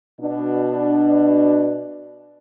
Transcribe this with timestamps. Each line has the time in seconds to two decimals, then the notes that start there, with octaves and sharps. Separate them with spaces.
0.20 B2 D4